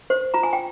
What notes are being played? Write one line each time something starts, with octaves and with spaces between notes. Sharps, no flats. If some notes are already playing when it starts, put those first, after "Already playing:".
C5
F4 A#5
G#5
G5